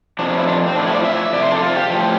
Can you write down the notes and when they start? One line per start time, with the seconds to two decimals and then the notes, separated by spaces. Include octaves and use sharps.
0.19 F2 C3 F3 D4
0.29 D4
0.38 E4
0.48 D4
0.66 C4
0.75 A2 F3 D4
0.86 E4
0.95 D5
1.04 E5
1.33 F2 C3 D5
1.43 C5
1.52 A4
1.62 F4
1.76 G4
1.90 A2 F3